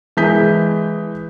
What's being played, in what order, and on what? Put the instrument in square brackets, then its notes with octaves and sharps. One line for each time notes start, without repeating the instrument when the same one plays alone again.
[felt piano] E3 G#3 D#6 G6 B6